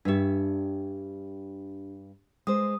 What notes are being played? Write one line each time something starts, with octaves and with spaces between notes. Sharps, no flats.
G2 D4 G4 E5
G#3 C5 D#6